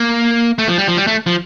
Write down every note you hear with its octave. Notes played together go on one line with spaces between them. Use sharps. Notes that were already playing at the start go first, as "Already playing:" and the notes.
Already playing: A#3
A3
F3
G3
F3
G3
A3
F3